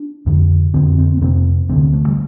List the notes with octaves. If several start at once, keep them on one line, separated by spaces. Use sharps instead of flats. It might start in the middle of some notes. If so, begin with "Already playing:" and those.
Already playing: D4
F2 D3
F2 D3 C4
C4
B3
F2 C3 C4
D2 D3 C4
A3
G3